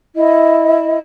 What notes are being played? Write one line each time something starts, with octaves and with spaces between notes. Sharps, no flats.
E4 D#5